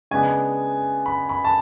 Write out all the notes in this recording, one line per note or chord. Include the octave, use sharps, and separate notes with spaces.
C#3 G#3 B3 D4 G#5
B5
B5
A5